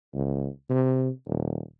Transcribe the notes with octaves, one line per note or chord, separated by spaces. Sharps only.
C#2
C3
D#1